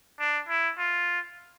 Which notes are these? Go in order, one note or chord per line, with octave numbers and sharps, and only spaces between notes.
D4
E4
F4